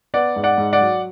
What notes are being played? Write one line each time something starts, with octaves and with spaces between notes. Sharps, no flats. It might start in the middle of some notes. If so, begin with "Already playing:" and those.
B3 D5 F#5
G#2
D5 F#5
G#2
D5 F#5
F#3